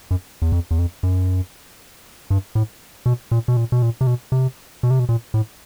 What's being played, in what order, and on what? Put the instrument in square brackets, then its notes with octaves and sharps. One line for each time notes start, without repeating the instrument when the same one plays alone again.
[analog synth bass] F#2
E2
F2
E2
F2
F#2
G2
A2
B2
A#2
B2
A#2
B2
A#2
C3
B2
C3
B2
C3
B2
A#2
A2